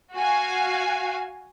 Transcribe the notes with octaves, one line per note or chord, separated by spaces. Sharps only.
F#4 F5 G#5